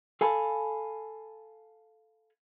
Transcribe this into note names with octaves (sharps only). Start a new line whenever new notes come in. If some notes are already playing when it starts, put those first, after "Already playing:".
A4 F5 G#5 A5 B5